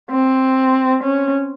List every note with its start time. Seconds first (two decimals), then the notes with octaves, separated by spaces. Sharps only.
0.10 C4
1.03 C#4